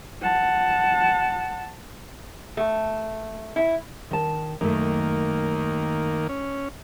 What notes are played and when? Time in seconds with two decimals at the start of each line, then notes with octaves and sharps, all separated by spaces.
0.22 F#5 A5
2.57 A3
3.56 E4
4.11 D#3 A5
4.61 F#2 D#3 A3 A#3
6.29 C#4